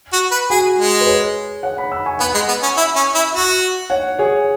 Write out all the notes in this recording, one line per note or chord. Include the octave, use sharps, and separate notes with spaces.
F#4
B4
F#4 G#4
G#3
B4
G#4 C#5
C#5 F#5
F#5 B5
B5 E6
G#5 C#6
B3 F#5 B5
G#3
B3
C#4
E4
C#4
E4
F#4
C#5 F#5
G#4 C#5